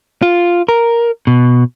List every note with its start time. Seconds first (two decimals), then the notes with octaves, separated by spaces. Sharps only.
0.22 F4
0.68 A#4
1.27 B2